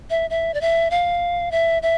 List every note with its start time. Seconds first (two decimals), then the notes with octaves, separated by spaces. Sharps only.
0.10 E5
0.30 E5
0.54 D5
0.61 E5
0.91 F5
1.52 E5
1.83 E5